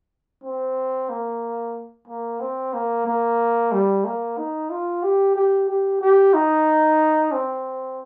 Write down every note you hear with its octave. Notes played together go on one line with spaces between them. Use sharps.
C4
A#3
A#3
C4
A#3
A#3
G3
A#3
D#4
F4
G4
G4
G4
G4
D#4
C4